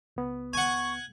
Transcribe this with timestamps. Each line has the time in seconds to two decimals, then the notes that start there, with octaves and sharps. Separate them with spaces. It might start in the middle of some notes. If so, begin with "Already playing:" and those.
0.16 C#2 B3
0.53 F#5 G#5 C#6